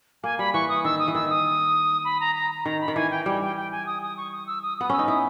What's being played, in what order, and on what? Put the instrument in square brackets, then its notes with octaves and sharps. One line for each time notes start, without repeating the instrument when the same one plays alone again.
[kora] A#3 [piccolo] G#5
[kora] G3 [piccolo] B5
[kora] E3 [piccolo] C#6
[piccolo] D#6
[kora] D#3 [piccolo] E6
[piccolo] D#6
[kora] E3
[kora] D#3 [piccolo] E6
[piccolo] D#6
B5
A#5
A#5
A#5
[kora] D#3 [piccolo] A#5
[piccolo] B5
[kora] D#3
[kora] E3 [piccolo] G#5
[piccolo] G5
[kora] G3 [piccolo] G5
[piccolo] G5
G5
G#5
D#6
D#6
C#6
D#6
E6
D#6
[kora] B3 [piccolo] D#6
[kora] C#4 [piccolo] E6
[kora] D#4
[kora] E4 [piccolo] D#6